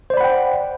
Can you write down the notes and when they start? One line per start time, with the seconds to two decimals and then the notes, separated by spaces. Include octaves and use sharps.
0.10 C5
0.14 D5
0.17 B5
0.21 F#5
0.24 G5